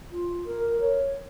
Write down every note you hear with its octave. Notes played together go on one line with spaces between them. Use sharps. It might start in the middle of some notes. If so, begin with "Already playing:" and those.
F4
A#4
C#5